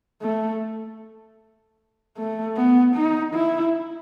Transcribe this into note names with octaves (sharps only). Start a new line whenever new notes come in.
A3
A3
B3
D#4
E4